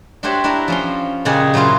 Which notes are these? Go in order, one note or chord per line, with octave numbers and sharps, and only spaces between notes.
D4 F#4 G4 C5 C#5 E5
D4 E4 B4 E5 A#5
F3 C#4 C6
A#2 C#3 G4 G#4 D#5 F#5
A#2 F#3 E4 F4 C5